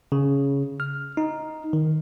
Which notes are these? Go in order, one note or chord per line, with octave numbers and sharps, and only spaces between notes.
C#3
F6
D#4
D#3